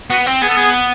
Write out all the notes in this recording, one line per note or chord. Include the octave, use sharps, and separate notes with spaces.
B3 F#4
C4
B3 G#4
A4
G#4